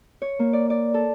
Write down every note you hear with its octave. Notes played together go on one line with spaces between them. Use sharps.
C#5
A#3
D5
D5
A4